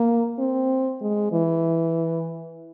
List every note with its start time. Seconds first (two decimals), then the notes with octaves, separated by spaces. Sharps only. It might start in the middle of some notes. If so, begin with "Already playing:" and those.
Already playing: A#3
0.39 C4
1.01 G#3
1.32 E3